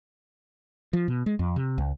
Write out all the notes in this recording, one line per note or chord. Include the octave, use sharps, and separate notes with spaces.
F3
B2
G#3
F2
C3
C#2